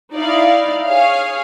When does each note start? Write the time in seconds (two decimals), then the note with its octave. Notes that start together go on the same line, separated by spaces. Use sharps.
0.16 D#4 E4 D5 F5
0.86 G#4 C#5 F5